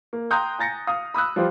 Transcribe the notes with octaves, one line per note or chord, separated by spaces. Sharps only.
A#3
G5 A#5 C6 D#6 F#6 G6
G#5 A#5 A6 A#6 C#7
F5 D#6
B5 D#6 E6 F#6
F3 G3 F4 G4 C5